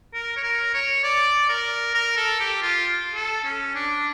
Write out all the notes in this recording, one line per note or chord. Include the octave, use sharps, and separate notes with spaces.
A#4
C#5
A#4
C#5
D5
A#4
A#4
A4
G4
F4
A4
C#4
D4